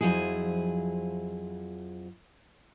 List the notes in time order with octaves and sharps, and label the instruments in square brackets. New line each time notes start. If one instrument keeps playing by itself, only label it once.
[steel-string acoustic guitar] F2 F3 F#3 E4 G#4